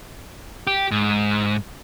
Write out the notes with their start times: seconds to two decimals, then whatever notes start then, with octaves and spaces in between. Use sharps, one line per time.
0.67 G4
0.91 G#2